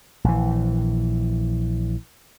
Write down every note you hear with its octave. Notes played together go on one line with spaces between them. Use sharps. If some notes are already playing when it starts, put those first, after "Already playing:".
A#1 E3